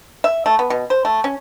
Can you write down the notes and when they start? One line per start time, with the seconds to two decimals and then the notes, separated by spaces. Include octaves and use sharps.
0.24 E5
0.46 A3
0.59 B3
0.70 B2
0.90 C5
1.05 A3
1.24 C#4